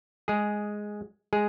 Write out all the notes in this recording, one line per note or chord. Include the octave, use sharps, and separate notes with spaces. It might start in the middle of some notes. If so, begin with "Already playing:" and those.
G#3 G#4
G#3 G#4